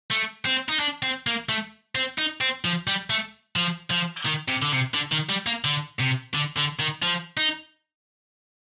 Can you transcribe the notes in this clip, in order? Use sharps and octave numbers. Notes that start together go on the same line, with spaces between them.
A3
C4
D#4
D4
C4
A#3
A3
C4
D#4
C4
F3
G3
A3
F3
F3
D#3
C3
D3
C3
D3
D#3
G3
A#3
D3
C3
D3
D3
D#3
F3
D#4